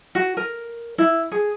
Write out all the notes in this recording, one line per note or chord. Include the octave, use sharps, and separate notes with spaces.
F#4
A#4
E4
G#4